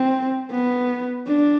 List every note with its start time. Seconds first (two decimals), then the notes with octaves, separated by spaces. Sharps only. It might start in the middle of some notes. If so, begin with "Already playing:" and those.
Already playing: C4
0.51 B3
1.27 D4